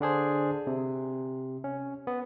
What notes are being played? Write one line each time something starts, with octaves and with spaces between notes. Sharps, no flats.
D3 D4 G#4 C5
C3
C#4
B3